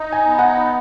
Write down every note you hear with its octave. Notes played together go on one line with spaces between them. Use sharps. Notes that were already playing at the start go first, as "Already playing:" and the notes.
Already playing: D#4
G#5
B3
F#5